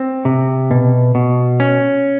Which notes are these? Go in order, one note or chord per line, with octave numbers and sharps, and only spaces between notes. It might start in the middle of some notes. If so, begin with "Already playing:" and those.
Already playing: C4
C3
B2
B2
C#4